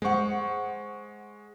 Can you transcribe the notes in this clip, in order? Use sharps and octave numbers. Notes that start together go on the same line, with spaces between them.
G#3 C5 F#5 C#6